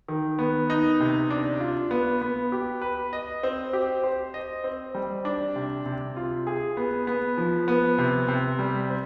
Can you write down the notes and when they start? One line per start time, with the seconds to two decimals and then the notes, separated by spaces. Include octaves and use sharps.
0.08 D#3
0.39 B3
0.70 D#4
1.00 C3
1.30 D4
1.60 F4
1.91 B3
2.22 B3
2.52 G4
2.82 B4
3.13 D#5
3.43 C4
3.73 G4
4.04 C5
4.34 D#5
4.64 C4
4.95 G3
5.25 D4
5.56 C3
5.86 C3
6.17 F4
6.47 G#4
6.77 B3
7.07 B3
7.38 F3
7.68 B3
7.98 C3
8.28 C3
8.59 G3
8.90 C4